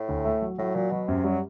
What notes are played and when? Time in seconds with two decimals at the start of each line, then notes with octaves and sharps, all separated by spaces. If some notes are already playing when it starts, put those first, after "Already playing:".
Already playing: A2
0.09 D2
0.25 A3
0.42 F#3
0.58 A2 F#3
0.75 A#2 F#3
0.91 B2 F#3
1.08 F#2 C3
1.24 F#3 G3